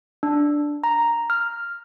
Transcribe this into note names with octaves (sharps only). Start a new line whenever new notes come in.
D4
A#5
F6